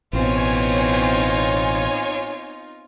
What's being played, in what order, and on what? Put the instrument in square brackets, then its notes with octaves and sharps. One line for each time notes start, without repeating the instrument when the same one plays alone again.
[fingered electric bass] A1 B2 [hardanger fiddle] B3 C4 [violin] D#4 F4 [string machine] C#5 G#5